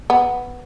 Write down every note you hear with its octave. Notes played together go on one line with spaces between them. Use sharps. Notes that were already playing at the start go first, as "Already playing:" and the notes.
B3